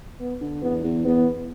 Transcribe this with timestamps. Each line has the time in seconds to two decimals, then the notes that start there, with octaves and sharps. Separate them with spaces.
0.20 B3
0.41 D3
0.62 E2 B3
0.84 E2
1.05 E2 B3